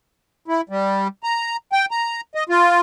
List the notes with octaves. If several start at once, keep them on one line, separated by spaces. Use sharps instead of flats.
E4
G3
A#5
G5
A#5
D#5
F4